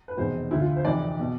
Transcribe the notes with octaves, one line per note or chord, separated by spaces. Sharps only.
B4
F1 E2 B2 C5
D2 D3 E4
F4
C5
F1 F2 E3 D5
B2